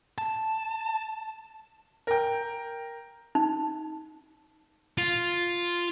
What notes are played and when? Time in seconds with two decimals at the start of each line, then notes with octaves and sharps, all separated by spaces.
0.18 A5
2.07 A#4 G5
3.35 D#4
4.98 F4